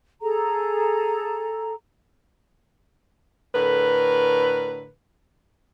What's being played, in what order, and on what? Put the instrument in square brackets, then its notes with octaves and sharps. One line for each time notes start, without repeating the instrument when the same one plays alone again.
[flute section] G#4 A4 A#5
[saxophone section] A2 D3 A#4 B4